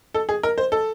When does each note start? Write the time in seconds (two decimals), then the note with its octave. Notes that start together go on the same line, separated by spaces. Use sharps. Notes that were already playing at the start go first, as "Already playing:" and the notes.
0.14 A4
0.29 G#4
0.43 A#4
0.58 C5
0.72 A4